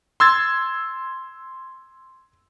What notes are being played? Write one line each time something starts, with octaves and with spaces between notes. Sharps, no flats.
C6 E6 G#6 A6